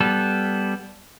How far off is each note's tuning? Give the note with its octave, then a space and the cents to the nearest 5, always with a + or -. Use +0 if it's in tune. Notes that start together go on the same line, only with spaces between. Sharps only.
G3 +0 B3 +0 A4 -15